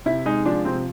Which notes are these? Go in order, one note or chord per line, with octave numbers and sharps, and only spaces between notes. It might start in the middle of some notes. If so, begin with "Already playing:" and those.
C3 E4
G#3 D#4
F3 D4
C3 C4